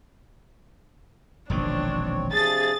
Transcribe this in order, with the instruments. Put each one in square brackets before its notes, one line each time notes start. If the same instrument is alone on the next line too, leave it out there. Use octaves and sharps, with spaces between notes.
[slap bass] E1 A#1 D#3 [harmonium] C4 C#5 [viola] D4
[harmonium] C3 F3 D4 [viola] G#4 [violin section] A6